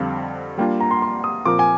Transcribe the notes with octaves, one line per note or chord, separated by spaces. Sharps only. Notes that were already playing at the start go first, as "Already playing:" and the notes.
Already playing: F2 D3 G3 C4 F5
G3 A#3 D4 F4 G5
A#5
C6
C6
D#6
A#2 F3 C4 F4 A#4 D6
G#5